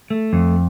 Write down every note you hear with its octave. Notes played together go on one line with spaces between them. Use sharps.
A3
F2